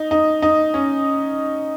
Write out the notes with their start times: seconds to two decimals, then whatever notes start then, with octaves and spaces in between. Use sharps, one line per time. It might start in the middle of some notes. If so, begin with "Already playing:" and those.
Already playing: D#4
0.11 D#4
0.42 D#4
0.74 C#4